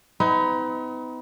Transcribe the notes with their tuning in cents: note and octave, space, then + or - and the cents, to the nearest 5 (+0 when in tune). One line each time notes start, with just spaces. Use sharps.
B3 +40 D#4 +40